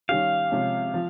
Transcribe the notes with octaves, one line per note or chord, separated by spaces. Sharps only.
D#3 G3 C#4 G4 F5
C3 F3 G#3 C#4
F3